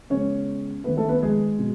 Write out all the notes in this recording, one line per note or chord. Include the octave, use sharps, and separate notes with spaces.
C#3 G#3 B3 C#4 C#5
D#3 A3 B3 B4
A3 A4
B3 B4
G#3 G#4
B2